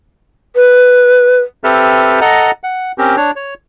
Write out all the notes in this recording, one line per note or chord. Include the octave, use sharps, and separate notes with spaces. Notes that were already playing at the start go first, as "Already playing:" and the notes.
B4
C4 G4 A4 B4 E5 F6
A4 D#5 F#5 A#5
F#5
C4 C#4 G4 A#4
D4 C#5
C#5